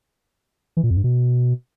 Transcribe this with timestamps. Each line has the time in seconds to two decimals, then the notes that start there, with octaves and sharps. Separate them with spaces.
0.77 E3
0.84 A#2
0.90 F2
0.97 G2
1.04 B2